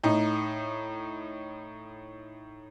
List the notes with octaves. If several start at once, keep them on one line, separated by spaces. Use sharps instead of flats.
A2 D#4